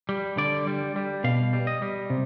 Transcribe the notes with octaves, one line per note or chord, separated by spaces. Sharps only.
G3
D3 D5
G3
G3
B2 F5
G3
D#5
G3
C3